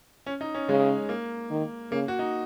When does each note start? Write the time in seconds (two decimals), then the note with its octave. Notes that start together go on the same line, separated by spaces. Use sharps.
0.26 C#4
0.41 D#4
0.54 C#4
0.69 C#3 G#3
1.09 A#3
1.50 D#3
1.91 C#3 A#3
2.08 F#4
2.19 D#4